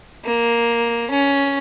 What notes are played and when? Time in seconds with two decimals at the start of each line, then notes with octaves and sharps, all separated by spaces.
0.24 A#3
1.10 C#4